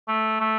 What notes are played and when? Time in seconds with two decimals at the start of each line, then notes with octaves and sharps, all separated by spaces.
0.08 A3
0.40 A3